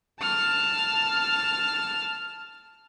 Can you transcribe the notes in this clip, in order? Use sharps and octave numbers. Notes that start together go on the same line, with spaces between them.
A5 F6